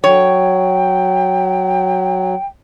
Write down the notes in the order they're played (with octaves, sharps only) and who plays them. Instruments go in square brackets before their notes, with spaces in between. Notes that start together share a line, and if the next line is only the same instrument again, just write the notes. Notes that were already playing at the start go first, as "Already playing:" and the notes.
[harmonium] F#3 [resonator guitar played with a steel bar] C#5 [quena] G5